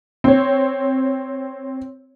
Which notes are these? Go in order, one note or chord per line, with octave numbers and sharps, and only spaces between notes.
C4 C#5